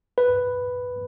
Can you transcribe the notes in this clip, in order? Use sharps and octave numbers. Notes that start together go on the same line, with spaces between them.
B4